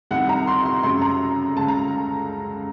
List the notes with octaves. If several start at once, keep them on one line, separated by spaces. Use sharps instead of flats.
C2 C3 D#3 F#5
A#5
C6
C6
F#2 C#3 C6
A#5
C#2 C#3 A5
A#5